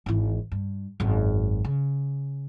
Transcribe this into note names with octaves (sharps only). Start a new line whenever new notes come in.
G#1 E3
G2
G#1 F#2
C#3